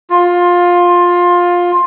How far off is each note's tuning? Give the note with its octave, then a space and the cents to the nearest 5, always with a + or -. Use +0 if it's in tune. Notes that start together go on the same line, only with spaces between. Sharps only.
F4 +15